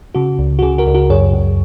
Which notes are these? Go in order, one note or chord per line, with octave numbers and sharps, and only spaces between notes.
C#3 F#4
C#2
F#4
C#3 G#4
F#4 A#4
C#2
F#4 A#4
F#2 G#4 C#5
F#2